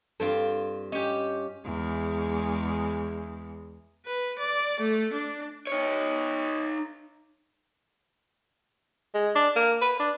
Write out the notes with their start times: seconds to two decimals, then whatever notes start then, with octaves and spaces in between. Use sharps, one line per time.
0.20 G2 C4 F4 A4
0.92 C#4 G4 D#5
1.65 E2 G#3
4.07 B4
4.39 D5
4.80 A3
5.13 D4
5.67 D#4 C#5
9.15 G#3
9.35 D4
9.56 A#3
9.81 B4
10.00 D4